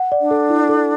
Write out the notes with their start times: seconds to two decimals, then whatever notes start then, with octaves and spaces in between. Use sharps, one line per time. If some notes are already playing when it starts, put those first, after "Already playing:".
Already playing: F#5
0.12 D5
0.21 D4
0.31 A4
0.50 E4
0.69 A4